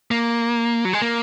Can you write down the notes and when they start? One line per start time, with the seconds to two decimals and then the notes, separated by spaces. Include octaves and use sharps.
0.11 A#3
0.85 F#3
0.93 G#3
1.02 A#3